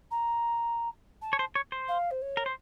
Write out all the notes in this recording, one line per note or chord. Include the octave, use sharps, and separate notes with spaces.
A#5
A5
C#5
C5
C#5
C5
F5
C5
C#5
A#4
C5